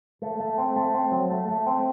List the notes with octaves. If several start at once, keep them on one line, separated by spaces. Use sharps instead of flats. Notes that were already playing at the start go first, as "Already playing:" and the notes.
A3
A3
C4
A3
C4
F#3
A3
A3
C4